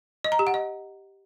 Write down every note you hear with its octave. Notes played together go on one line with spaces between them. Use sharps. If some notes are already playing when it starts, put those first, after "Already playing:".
D#5
A#5
G4
F#5
D#5